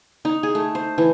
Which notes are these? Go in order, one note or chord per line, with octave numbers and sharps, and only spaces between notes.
D#4
G#4
A3
C5
E3